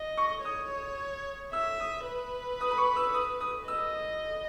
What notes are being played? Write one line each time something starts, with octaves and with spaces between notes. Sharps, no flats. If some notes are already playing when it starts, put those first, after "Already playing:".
Already playing: D#5
C#6
C#5 D#6
E5 E6
D#6
B4
D#6
B5
C#6
E6
D#6
D#6
D#5 E6